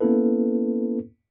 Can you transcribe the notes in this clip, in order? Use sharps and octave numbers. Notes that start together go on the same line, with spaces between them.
A#3 B3 C#4 E4 A4 B4